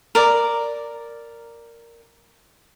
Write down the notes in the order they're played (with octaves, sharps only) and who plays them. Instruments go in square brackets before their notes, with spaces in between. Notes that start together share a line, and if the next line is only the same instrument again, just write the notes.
[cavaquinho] A#4 D5